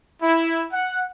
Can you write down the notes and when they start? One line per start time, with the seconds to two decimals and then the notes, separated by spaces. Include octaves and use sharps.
0.22 E4
0.72 F#5